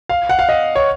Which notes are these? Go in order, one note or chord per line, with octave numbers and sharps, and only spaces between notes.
F5
F#5
F5
D#5
C#5